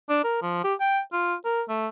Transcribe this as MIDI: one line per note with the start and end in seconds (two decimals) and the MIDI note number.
0.09 0.20 62
0.24 0.38 70
0.42 0.61 53
0.64 0.74 67
0.80 1.00 79
1.13 1.34 65
1.45 1.62 70
1.68 1.87 57